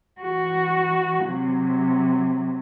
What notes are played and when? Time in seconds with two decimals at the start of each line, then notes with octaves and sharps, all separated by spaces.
0.21 E3 F#4
1.24 C3 F#3